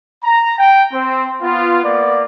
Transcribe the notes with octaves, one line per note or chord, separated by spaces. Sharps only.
A#5
G5
C4
B3 F4
A#3 B3 D5